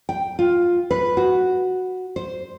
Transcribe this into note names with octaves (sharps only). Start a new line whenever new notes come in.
G5
F4
B4
F#4
C5